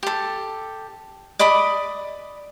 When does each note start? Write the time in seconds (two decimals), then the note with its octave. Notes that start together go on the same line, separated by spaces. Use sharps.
0.03 G4 A4
1.39 D5 D#5 B5 D6